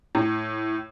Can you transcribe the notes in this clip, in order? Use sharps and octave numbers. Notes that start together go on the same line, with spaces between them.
A2